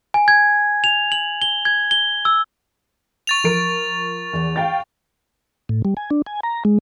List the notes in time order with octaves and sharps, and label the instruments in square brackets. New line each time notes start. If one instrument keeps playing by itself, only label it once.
[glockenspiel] G#5
G#6
F7
F#7
G7
G#6
G7
E6
[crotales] C#6 A6 F7
[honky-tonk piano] F3 A#4 D7
E2
F5 G5 A6
[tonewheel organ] A2
G3
G#5
D4
G#5
A#5
G#3